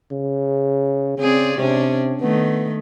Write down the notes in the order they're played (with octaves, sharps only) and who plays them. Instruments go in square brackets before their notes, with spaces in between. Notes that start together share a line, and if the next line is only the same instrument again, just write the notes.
[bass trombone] C#3
[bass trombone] C#3 [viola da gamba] C4 G#4 D5
[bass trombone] C3 [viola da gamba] C#4 D4
[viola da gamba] D#3 A3 [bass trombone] B3